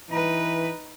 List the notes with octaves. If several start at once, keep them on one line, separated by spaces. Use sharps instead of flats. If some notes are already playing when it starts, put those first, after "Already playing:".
E3 D#4 B4